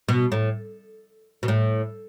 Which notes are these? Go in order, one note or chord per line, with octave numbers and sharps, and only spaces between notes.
B2
A2
B2
A2